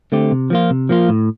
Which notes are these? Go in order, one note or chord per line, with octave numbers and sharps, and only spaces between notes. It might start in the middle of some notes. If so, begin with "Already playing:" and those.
D3 A3 C4 G4
C3
F3 A#3 F4
C3
F3 A#3 F4
A2